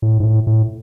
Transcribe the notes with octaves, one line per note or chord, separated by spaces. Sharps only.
A2
G#2
A2
A2